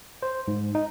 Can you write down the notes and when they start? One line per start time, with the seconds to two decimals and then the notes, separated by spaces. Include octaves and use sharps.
0.23 C5
0.48 G#2
0.75 D#4